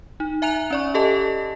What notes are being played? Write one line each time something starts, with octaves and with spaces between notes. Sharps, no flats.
D#4
E5 G#5 A#5 F#6 F7
C#4 D5 C#6
G4 A4 D#5 A5